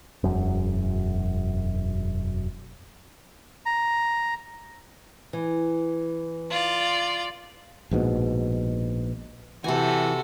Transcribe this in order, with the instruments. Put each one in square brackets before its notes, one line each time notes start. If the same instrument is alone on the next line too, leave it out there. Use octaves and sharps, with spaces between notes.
[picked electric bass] E1 F#2
[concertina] A#5
[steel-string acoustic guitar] E3
[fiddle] F4 D5
[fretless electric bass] A#1 G#2 B2
[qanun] C3 G#5 [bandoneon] E3 [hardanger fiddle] F#4 A4